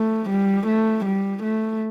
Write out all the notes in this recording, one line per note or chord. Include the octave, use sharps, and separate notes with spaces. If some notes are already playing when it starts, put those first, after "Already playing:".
Already playing: A3
G3
A3
G3
A3